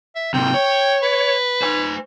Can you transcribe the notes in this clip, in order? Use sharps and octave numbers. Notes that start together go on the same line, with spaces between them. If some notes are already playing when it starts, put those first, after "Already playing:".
E5
G#2 C3 G5
C#5
B4
C5 G#5